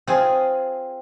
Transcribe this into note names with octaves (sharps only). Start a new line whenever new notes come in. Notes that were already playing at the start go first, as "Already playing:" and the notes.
C4 F4 G#4